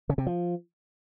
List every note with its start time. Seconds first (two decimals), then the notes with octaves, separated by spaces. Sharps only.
0.09 C#3
0.18 C3
0.26 F3